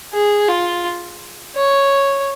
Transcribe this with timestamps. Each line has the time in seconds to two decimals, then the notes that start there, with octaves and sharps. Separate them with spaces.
0.13 G#4
0.48 F4
1.56 C#5